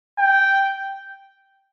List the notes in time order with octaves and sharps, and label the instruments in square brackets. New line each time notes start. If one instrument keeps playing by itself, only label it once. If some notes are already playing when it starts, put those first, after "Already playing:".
[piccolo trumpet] G5